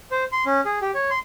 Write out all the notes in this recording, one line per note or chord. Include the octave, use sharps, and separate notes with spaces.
C5
C6
C#4
G#4
G4
C#5
C6